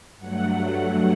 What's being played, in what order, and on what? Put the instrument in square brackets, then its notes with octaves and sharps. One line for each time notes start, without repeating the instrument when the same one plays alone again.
[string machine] G2 F#3 A3 F#5